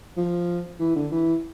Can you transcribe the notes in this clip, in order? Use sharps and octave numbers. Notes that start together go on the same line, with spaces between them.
F3
E3
D3
E3